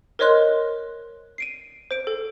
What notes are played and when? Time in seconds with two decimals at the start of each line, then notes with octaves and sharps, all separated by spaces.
0.19 A#4 C5 C#5 D#5 C6 F#6
1.38 C7 D7 D#7
1.91 C5 D7
2.07 A4